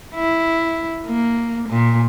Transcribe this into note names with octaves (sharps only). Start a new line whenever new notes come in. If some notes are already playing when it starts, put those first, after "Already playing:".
E4
A#3
A#2